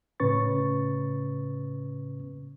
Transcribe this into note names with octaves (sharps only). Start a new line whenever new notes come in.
A2 C#3 C#4 B4 C#6 A6